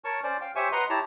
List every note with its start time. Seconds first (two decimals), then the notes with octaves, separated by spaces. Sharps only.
0.05 A#4 C#5 A5 C#6
0.23 C#4 C5 D5
0.41 F5 G5
0.55 G4 C5 C#5 E5 G#5 C#6
0.72 B4 D#5 F#5 A#5 C6
0.90 E4 G4 C#5 A5 A#5